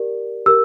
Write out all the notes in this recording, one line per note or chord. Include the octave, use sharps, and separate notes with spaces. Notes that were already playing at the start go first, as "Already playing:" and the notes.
Already playing: G4 A#4 D5
G4 A#4 E6